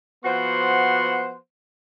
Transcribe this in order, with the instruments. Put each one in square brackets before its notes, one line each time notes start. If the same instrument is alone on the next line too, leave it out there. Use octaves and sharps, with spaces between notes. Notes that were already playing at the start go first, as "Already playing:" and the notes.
[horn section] F3 B3 F#4 C5 F#5 C6